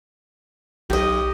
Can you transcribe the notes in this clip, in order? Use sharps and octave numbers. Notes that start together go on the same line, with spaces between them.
B1 G4 D#5